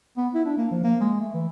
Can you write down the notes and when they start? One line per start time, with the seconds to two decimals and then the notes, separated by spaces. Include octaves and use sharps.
0.17 B3
0.34 E4
0.46 D4
0.57 A#3
0.71 F3
0.84 A#3
1.01 G#3
1.21 A3
1.34 E3